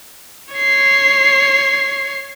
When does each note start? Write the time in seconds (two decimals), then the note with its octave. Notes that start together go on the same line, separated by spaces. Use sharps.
0.54 C#5 C7